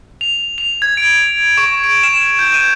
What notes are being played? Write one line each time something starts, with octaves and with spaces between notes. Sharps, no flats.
F7
F7
G#6
D7
C#6
D7
E7
G6
D#7